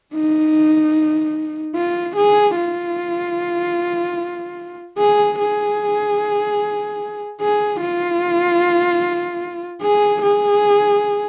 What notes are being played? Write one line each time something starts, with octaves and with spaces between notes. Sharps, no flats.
D#4
F4
G#4
F4
G#4
G#4
G#4
F4
G#4
G#4